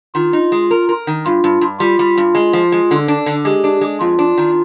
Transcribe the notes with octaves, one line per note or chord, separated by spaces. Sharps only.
D#3 F4
D#4
G#3
A#4
A#4
D#3
G2 F4
G2
G2
G3 F4
G3
G2
G#3
F3
G#3
D3
D4
D3
G#3 G4
D4
G#3
F2 F4
D4
D#3